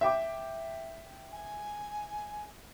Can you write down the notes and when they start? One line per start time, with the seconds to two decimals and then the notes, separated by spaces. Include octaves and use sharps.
0.01 E5 G5 D6
1.32 G#5